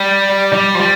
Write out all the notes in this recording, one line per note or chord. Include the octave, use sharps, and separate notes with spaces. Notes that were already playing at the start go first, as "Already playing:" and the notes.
Already playing: G3
G3
F3
G3